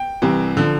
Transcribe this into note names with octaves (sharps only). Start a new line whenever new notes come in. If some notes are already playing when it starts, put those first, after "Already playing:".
Already playing: G5
C2 C3 E3
D3 F3